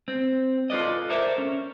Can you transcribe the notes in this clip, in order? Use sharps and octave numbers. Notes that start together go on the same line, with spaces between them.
C4
F4 A4 B4 D5 D#5
A4 A#4 C5 D5 E5
C#4